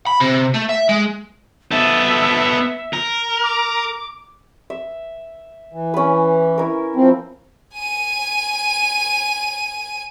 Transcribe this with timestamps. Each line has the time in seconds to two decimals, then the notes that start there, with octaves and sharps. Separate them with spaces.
0.07 B5
0.21 C3
0.55 A3
0.69 E5
0.89 G#3
1.72 B3 A4 E5
2.93 A#4
3.43 D6
4.70 E5
5.73 E3
5.94 C#4 B4
6.58 E4 A#4
6.96 F3 C4
7.76 G#5 D#7